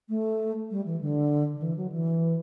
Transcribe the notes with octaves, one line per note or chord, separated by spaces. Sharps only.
A3
G3
E3
D3
D3
E3
F#3
E3